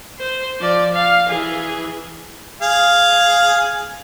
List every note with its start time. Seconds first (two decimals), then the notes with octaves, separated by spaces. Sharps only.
0.19 C5
0.61 F3 D5
0.94 F5
1.29 E3 G#4
2.62 G#4 F5